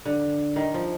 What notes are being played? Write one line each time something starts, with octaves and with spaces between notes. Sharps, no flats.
D3
D#3
F3